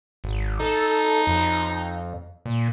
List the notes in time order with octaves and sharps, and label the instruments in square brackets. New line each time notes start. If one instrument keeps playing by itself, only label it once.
[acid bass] G#1
[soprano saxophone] D#4 [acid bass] A4
[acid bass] F2
A#2